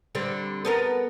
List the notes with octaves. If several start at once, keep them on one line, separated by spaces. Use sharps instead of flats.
D3 G3 C4
B3 A4 A#4